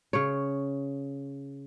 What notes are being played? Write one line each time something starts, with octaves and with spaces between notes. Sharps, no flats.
C#3 C#5